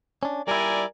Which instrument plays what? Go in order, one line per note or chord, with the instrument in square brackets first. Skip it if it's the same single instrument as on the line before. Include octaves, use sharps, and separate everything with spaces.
[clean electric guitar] C#4 D4
[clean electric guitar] G3 E4 [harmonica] A#4 D5 G#5